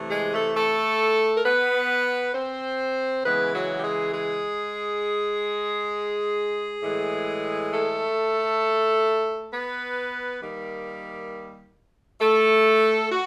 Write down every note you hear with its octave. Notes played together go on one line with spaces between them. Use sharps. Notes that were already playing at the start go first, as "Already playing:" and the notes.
Already playing: C3 E3 A3
G#3 G#4
A3 A4
A3 A4
A#4
B3 B4
C4 C5
C#3 E3 G#3 B3 B4
F#3 F#4
G4
G#3 G#4
G#3 G#4
A2 E3 G#3
A3 A4
B3 B4
D#3 G3 A#3
A3 A4
F#4